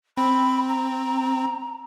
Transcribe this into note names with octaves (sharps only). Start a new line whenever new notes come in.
C4 B5
A#5